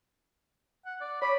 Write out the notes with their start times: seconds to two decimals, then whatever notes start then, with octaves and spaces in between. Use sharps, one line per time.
0.86 F#5
1.01 D5
1.22 C#5 B5 D6 B6